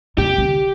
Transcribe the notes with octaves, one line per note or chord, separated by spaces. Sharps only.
C3 G4
D3